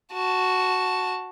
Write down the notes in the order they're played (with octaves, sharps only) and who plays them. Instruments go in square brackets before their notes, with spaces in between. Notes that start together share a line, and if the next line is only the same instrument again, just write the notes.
[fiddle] F#4 A5